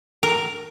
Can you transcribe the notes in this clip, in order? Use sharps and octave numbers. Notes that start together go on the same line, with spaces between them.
A#4